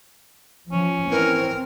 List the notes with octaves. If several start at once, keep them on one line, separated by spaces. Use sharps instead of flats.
F3 C#4
E3 C4 A#4